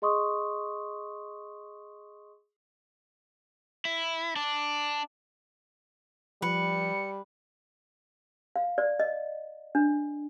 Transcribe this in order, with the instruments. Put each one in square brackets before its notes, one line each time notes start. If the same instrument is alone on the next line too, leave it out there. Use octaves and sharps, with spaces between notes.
[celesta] G#4 D#5 C6 C#6 D#6
[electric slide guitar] E4
D4
[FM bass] F3 [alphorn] G3 [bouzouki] B4 [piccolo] C#7
[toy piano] F5
D5
D#5
D4